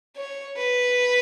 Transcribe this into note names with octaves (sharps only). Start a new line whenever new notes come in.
C#5
B4